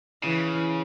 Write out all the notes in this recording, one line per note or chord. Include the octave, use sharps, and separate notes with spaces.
C#3 E3